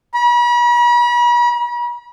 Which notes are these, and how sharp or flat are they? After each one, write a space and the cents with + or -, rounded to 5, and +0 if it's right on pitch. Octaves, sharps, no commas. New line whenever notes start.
B5 -45